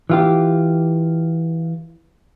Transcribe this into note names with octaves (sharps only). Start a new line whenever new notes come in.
E3 F4 G4